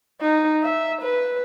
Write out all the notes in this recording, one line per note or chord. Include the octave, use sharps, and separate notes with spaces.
D#4
E5
B4